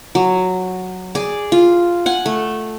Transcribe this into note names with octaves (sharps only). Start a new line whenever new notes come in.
F#3
G#4 D5
F4
F#5 G#5
A3